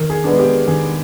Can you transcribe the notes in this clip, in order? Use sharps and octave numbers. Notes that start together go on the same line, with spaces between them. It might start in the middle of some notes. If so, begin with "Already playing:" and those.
Already playing: D#3 A#4
G#4
G#3 B3 D4
G4
D#3 G#4